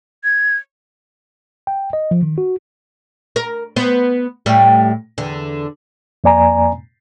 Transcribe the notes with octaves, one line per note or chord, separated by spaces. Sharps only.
G#6
G5
D#5
F3
D#3
F#4
A#4
B3 C5
A2 G3
E2 D3
F2 A#3 D5 G#5 A#5